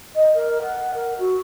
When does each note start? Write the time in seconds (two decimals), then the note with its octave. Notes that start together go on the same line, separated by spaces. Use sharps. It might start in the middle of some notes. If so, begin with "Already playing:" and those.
0.15 D#5
0.34 A#4
0.62 F#5
0.94 A#4
1.18 F#4